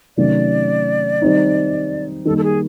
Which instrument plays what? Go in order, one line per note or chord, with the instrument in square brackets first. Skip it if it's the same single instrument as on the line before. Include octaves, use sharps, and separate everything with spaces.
[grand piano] C3 D#3 F#3 A3 C#4 [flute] D5
[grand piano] D#3 G3 C4 D#4
[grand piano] D#3 G3 A#3 [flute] A4
[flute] A4
G#4